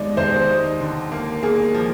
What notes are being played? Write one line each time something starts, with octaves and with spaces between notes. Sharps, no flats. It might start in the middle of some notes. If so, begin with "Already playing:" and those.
Already playing: D#2 G#3 D#4 D5
D#2 C5
D#4
D3
A#3
A#3 G#4
F3